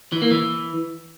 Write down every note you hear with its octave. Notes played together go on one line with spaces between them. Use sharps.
E3
A#3
E3